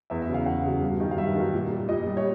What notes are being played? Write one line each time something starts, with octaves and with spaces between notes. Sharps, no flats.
E2 E5
E5
C#3 F#3
F5
E2 F#5
C#3 F#3
G2
D#3 F#3
F5
G2 E5
D#3 F#3
A#2
G3
A#2 D#5
G3
C#5